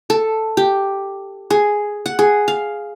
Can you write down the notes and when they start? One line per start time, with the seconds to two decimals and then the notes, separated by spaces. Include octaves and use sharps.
0.10 A4
0.57 G4
1.50 G#4
2.06 F#5
2.19 G#4
2.48 F5